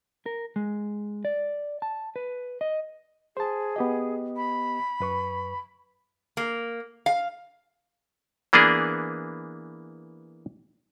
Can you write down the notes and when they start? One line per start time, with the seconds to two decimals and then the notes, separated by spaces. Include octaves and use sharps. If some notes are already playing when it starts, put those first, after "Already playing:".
0.26 A#4
0.56 G#3
1.25 D5
1.82 A5
2.16 B4
2.61 D#5
3.37 G#4 C5 A5
3.76 B3 G4 D#5
4.36 B5
5.00 F#2 B4 C#6
6.37 A#3
7.06 F5
8.53 E3 A#3 B3 D4 G#4